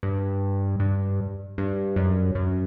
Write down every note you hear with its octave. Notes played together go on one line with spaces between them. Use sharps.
G2
G2
G2
F#2
F#2